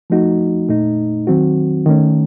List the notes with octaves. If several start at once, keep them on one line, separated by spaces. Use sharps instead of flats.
F3 A3 D#4 F#4
A#2 A3 D#4
D#3 F#3 C4 F#4
D#3 A3 C#4